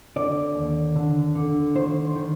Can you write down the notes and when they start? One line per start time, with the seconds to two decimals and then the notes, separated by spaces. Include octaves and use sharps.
0.16 D3 D5
0.55 D#2
0.96 D3
1.35 D3
1.75 D#3 C5
2.15 D#3